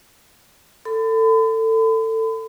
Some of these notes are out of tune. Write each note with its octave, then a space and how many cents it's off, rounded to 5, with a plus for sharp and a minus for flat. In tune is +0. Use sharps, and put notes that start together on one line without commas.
A4 +25 B5 +40